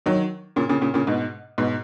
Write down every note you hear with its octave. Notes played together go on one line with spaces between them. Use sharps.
D#3 F#3
A#2 C#3
A#2 C#3
A#2 C#3
A#2 C#3
G#2 B2
G#2 B2